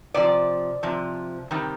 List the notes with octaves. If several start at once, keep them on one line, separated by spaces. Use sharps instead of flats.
C3 F3 D5
C3 F3
C3 D#3 G3